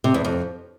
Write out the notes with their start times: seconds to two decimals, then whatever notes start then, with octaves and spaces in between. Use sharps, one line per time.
0.04 C3
0.14 E2
0.25 F2